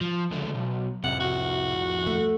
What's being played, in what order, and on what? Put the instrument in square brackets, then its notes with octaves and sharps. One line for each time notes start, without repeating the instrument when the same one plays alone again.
[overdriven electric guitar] F3
C#2 D3
B1
[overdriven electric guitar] C2 F2 [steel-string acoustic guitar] C3 [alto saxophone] F#5
[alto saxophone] F#4
[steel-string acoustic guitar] A3